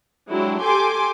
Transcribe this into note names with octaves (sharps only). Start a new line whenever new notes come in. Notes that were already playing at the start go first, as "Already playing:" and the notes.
F#3 G#3 D4 E4 G4
G4 A4 G#5 C6 D6